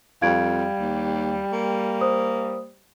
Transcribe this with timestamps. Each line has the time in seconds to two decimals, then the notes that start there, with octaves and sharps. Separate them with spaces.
0.22 F2 G3 F5 G#6 D7
0.80 D#2
1.52 A#3
2.01 C5 D#6